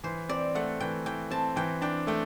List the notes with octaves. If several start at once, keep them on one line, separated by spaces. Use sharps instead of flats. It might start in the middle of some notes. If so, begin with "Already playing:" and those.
E3 C5
C4 D5
A3 F#5
E3 G5
E3 G5
C4 A5
E3 G5
D4 G5
A3 G5